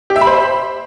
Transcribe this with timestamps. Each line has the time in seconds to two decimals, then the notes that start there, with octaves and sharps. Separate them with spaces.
0.10 G4
0.16 E5
0.21 B5
0.27 C5